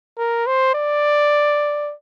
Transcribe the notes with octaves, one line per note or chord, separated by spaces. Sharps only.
A#4
C5
D5